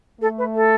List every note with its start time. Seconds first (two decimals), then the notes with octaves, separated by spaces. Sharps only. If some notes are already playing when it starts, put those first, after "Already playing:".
0.21 A3 A4
0.38 B4
0.55 A4